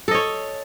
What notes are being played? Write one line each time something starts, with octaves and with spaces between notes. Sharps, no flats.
A4 C#5 D#5